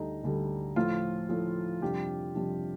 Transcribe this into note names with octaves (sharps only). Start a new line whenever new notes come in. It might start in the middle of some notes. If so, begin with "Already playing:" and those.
Already playing: D2 D3 G3 D#4
D2 D3 G3
A2 F3 A3 F4
A2 F3 A3
F2 C3 G3 D4 G4
F2 C3 G3 D4